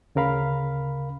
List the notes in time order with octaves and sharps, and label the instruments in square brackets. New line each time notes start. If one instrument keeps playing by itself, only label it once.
[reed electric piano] D2 C#3 A#4 F5 B5